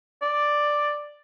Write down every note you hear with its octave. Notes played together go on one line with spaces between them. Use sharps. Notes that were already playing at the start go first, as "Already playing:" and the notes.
D5